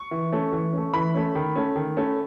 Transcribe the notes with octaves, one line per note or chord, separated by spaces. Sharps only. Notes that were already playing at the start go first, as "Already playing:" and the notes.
Already playing: C#6
E3
A3 C#4
E3
A3 C#4
E3 B5
A3 C#4
D#3
A3 C#4
D#3
A3 C#4